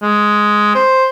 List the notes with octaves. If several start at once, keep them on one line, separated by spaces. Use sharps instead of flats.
G#3
C5